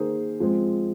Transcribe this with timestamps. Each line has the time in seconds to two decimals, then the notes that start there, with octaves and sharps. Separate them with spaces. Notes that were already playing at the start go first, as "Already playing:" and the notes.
Already playing: D#3 A#3 G#4 C5
0.40 F3 G#3 C4